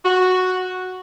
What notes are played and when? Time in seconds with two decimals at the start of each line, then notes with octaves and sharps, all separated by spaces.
0.04 F#4